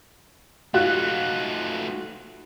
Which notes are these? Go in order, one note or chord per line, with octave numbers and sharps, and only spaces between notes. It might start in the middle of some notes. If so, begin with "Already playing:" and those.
A3 D#4 F4 F#4 F#6